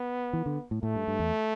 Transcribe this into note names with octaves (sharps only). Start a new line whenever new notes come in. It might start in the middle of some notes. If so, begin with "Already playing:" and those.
Already playing: B3
E3
D3
A2
A2 A3
G2
G2
E2